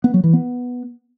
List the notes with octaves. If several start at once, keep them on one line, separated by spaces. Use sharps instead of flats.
B3
F#3
E3
B3